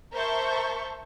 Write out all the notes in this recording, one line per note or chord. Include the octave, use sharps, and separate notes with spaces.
A#4 C5 E5 A5 C#6 G6